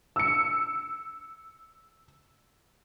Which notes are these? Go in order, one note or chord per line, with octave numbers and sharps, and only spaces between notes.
E6 C#7